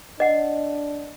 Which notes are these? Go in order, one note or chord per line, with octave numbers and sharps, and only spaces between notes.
D4 D#5 F#5